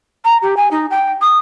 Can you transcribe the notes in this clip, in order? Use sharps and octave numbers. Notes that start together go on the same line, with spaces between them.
A#5
G4
G#5
D#4
G5
D#6